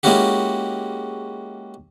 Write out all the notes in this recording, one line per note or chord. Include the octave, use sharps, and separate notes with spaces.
G#3 A#3 C#4 E4 F#4 G4